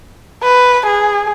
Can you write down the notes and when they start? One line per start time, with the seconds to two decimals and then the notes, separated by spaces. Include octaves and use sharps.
0.43 B4
0.86 G#4